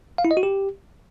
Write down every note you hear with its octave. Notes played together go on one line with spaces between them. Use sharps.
F5
E4
D#5
F#4
G4